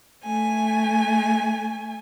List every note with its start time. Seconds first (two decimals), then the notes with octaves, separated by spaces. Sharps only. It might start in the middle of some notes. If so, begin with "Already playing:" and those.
0.24 A3 G#5